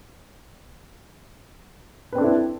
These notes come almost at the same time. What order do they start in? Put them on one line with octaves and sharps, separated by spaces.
B4 C4 D4 A4 E4